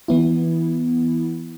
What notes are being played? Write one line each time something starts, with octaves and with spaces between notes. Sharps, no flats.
E3 B3 E4